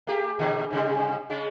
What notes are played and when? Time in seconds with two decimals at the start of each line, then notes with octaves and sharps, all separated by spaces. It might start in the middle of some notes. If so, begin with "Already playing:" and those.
0.07 A3 G4 G#4
0.39 A#2 D3 E3
0.71 G#2 C3 G3
1.30 C#3 G#3 C#4